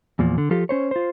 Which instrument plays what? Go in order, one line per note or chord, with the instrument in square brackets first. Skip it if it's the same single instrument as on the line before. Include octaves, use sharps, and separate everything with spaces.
[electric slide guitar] E2 A#2 F3
D3
F3 F4 G4 A4
C#4 C5 C#5
F4 C5